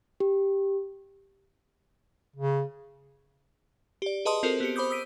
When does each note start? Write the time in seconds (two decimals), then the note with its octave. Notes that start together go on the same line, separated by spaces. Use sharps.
0.20 G4
2.36 C#3
4.02 G4 D5
4.25 G#4 B4 D#5 A5 C6 D#6
4.43 C4 F4 F#4 A4 A#4 C5
4.60 B3 G4 C#7
4.76 C5 B5 D6 D#6 G6
4.90 D#6 E6 B6 D7 D#7